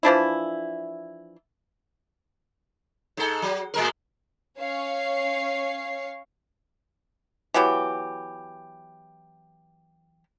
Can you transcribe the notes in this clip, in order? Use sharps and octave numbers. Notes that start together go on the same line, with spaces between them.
E3 F3 D4 E4
G#2 A4
F#3
A2 G#3 A#4
C#4 C#5 F5 C#6 C7
E3 F#3 B3 G4